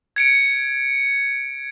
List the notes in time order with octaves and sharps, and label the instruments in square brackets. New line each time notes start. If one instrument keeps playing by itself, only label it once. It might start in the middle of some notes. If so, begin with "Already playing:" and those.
[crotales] G#6 C#7 D7